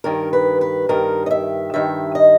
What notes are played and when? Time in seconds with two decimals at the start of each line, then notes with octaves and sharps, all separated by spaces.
0.04 G2 D#3 A#4
0.33 B4
0.61 B4
0.89 G2 D#3 A#4
1.26 D#5
1.31 E5
1.74 G2 D#3 E5
2.15 D#5